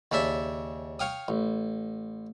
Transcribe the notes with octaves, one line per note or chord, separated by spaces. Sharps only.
D#2 C#3 D4 E5 A5
C#5 F5 G5 D#6
A1